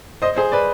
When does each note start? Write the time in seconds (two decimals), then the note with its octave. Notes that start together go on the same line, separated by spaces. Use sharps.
0.22 C5 D#5
0.36 G#4 C5
0.52 B4 D5